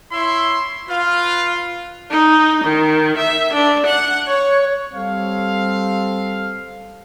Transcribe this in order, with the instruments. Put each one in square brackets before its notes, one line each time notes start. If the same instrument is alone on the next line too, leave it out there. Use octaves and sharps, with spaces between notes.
[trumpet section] E4 C#5 E5 [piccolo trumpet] C6
[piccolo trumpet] F4 [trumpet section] B4 F5
[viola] D#4
D#3
E5
D4
F#5
C#5
[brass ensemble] G3 C4 A4 F5